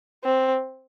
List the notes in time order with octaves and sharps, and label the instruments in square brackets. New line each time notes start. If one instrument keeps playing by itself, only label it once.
[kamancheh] C4